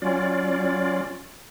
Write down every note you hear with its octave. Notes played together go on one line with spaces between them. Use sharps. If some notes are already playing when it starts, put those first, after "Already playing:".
F#3 C#4 F4 D5